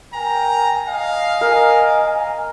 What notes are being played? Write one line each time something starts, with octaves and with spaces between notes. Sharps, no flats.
A#4 G5 G#5 A#5
D#5 F5
A#4 D#5 G#5